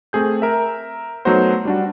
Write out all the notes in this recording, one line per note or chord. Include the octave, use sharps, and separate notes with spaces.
A3 C4 G#4 G6
A#4 E5
F#3 A3 B3 D#4 F#4 C5
G3 D4 F#4